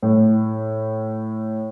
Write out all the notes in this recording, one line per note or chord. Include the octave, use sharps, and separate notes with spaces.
A2